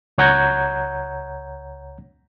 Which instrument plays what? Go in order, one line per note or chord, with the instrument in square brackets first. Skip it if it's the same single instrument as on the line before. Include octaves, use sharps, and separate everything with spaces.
[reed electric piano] C#2 C#5 F#5 A#5 G6 G#6